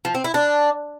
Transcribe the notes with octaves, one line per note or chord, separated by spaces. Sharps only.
F3
C4
E4
D4